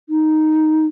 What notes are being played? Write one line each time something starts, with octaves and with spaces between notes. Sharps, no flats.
D#4